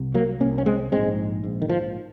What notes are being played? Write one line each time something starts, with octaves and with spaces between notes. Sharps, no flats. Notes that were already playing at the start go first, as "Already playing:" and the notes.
Already playing: C2 C3
F#3 A#3
C2 C3 A#3 C#4
C#4
G#3 C4
A#1 G#2 G#3 C4
A#1 G#2
D#3
F3